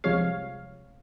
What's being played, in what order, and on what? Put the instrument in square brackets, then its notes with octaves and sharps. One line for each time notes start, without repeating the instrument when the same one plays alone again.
[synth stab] C2 C3 F3 G#3 C#5 F5